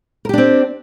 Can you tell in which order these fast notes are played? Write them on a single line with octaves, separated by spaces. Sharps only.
A#4 G4 D4 C4